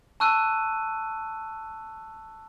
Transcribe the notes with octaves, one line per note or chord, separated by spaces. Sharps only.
A5 C#6 E6 F#6 D#7